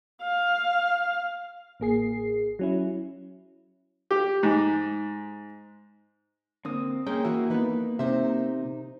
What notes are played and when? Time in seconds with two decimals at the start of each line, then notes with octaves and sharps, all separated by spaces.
0.23 F5
1.80 A1 A#3 G#4 C7
2.59 F#3 C#4 E4
4.11 G4
4.43 G#2
6.65 D3 A#3 C4 D#6
7.07 G#3 A#3 C#4 G5
7.24 E3 F#4 A#4 E5
7.50 E3 B3 D#4 B4
7.99 C3 D#4 C5 E5